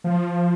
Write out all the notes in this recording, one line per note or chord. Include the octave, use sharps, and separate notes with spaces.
F3